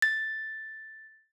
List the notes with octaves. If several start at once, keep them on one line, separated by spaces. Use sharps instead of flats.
A6